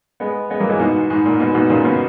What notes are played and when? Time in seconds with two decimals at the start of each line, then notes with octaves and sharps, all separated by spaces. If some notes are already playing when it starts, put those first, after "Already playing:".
0.20 G#3 B3
0.50 G#3 B3
0.60 F#3 A#3
0.70 E3 G#3
0.80 G#2 B2
1.10 G#2
1.25 A#2
1.39 G#2 B2
1.55 G#2 B2
1.70 A#2 C#3
1.85 B2